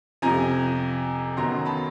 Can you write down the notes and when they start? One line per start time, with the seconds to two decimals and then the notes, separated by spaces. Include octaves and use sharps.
0.22 F2 C3 F3 G#5 A#5
1.37 F#2 D#3 F#3 B3 A#5 C6
1.65 A5 B5